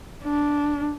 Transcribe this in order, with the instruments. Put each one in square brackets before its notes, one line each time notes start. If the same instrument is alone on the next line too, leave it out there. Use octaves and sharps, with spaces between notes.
[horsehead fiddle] D4